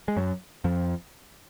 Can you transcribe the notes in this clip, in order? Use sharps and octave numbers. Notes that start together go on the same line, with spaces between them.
G#3
F#2 F#3
F2 F3